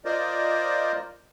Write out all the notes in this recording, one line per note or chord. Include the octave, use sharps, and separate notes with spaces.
F4 A#4 C5 D5 D#5